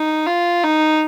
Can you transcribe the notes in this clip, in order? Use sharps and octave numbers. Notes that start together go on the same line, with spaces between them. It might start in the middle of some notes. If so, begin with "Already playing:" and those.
Already playing: D#4
F4
D#4